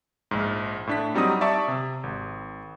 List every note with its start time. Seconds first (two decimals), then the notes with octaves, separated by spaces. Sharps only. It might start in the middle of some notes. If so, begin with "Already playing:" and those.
0.31 A#1 G#2
0.87 A2 D4 B6
1.14 F#3 G3 C4 D#4 D#6
1.41 D5 E5 A5 C#6 D6
1.68 C3
2.03 G#1